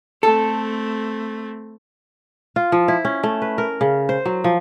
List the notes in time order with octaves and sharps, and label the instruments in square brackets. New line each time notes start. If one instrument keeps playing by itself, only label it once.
[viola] A3 C4 [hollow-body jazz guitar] A4
[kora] F4
F3
E4
C#4
A3
B4
A#4
C#3
C5
F#3
F3